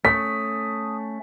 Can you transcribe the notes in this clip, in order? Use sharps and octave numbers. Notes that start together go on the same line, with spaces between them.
A3 C#4 D#6 B6